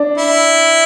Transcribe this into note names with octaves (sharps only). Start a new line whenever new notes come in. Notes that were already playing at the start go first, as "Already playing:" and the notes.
Already playing: D4
E4